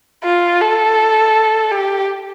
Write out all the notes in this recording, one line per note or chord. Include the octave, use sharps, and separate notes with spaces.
F4
A4
G4